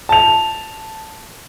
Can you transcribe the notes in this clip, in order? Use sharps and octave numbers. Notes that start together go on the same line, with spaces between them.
A5 F7